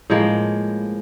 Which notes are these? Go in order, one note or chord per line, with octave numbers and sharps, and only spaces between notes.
A2 F3 G#3 A#3